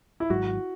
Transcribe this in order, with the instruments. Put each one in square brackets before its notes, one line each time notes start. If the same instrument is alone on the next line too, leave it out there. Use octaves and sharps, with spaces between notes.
[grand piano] E4
[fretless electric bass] G#1 G#2 F#3 [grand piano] F#4